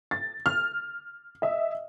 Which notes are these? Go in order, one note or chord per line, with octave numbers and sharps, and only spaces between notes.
A6
F6
D#5 E5